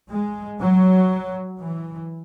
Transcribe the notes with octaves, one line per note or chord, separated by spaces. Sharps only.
G#3
F#3
E3